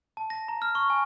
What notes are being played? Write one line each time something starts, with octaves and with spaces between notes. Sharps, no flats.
A5
A#6
A#5
F6
C#6
G#5